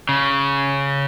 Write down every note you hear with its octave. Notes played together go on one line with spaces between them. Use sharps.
C#3